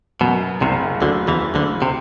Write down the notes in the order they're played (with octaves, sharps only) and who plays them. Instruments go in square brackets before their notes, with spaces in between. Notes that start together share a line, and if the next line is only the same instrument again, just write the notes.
[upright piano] F#2 [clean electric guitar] B2
[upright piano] F#1 [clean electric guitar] C2 C3
[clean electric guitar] D2 D3 [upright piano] F#3
[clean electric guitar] E2 E3
[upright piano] F#1
[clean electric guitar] D2 D3
C3